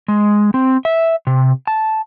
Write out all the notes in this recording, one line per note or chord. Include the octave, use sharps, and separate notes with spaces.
G#3
C4
E5
C3
A5